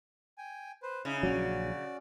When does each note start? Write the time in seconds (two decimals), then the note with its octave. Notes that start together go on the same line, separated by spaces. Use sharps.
0.38 G5 G#5
0.83 B4 C5
1.05 C#3 D#4 E4
1.23 A#1 F#3 F#4 D5